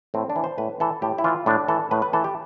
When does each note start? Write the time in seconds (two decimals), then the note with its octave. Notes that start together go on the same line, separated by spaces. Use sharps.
0.14 A2 C4
0.30 D4
0.36 E3
0.44 C5
0.58 A2 B4
0.80 E3 A4
1.02 A2 G4
1.18 E4
1.24 E3 F4
1.46 A2 D4
1.68 E3 A4
1.91 A2 B4
2.02 B4
2.13 E3 A4
2.24 G4